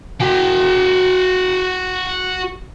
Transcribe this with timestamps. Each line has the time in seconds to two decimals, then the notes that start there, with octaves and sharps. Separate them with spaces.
0.20 F#4 G5